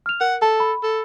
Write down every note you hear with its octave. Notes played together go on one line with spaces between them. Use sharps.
F6 F7
A#4 F#5
A4 A5
B5
A4